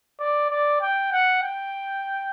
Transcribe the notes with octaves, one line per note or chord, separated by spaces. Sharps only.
D5
D5
G5
F#5
G5